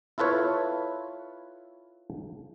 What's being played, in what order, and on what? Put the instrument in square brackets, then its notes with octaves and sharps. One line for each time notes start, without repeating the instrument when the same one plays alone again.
[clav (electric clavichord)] E4 F4 A4 B4 C#5